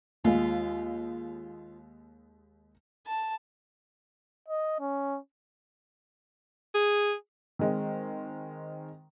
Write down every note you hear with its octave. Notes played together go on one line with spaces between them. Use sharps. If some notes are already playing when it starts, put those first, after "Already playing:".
D#2 G#3 F4
A5
D#5
C#4
G#4
D#3 G#3 C4